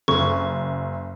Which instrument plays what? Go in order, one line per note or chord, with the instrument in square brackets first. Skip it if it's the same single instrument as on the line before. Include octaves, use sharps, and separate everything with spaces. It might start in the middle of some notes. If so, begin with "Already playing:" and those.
[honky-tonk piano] F#1 [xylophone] C#6